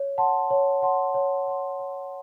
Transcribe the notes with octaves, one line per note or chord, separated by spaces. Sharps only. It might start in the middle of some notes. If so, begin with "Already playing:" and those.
Already playing: C#5
F#5 A5 C6
C#5
F#5 A5 C6
C#5
F#5 A5 C6
C#5